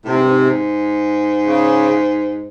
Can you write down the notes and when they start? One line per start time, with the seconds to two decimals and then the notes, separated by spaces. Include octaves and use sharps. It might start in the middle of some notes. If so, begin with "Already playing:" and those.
0.05 A2 C3
0.13 G#2
0.21 G2
0.28 G#2
1.46 C#3